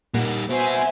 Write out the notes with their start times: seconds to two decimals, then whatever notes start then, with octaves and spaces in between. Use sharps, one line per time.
0.14 A#2 G3 A#3 D#4 F#5
0.50 B3 F#4 C5 E5 G#5